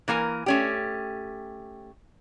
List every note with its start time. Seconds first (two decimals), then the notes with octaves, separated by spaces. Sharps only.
0.08 E3 A#3 A#4 G#5
0.46 A3 C#4 G4